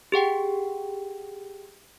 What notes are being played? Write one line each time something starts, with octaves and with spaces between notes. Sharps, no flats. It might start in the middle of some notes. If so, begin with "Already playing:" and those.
G4 G#4 F#5 G5